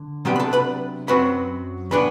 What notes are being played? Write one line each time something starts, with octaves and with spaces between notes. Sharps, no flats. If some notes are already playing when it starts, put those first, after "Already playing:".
Already playing: D3
C3 F#3 B3 D4 G4 G5
B5
A4 A5
B4 B5
F#2 F#3 C4 B4 B5
A2 E3 B3 D4 B4 B5